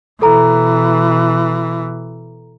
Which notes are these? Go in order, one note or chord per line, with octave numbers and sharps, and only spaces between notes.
B2 E3 A4 A#5